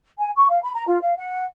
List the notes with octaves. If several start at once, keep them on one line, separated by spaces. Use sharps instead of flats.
G#5
C#6
F5
B5
A#5
F4
F5
F#5